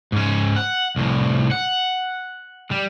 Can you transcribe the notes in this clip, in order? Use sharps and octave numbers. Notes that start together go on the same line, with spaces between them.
G#2 C#4
F#5
C2 A2
F#5
G3